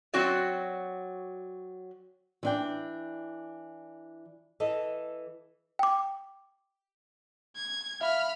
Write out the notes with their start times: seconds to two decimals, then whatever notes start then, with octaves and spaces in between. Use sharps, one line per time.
0.14 F#3 C4 F#4 D5
2.43 E3 D4 G5
4.60 E3 A4 D#5
5.79 G5 D6
7.56 G#6
8.01 E5 F5 B5 F6